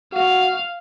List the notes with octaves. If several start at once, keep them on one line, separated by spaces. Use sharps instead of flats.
F#4 F5